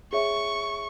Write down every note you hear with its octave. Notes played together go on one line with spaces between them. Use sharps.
G#4 C#5 E5 C#6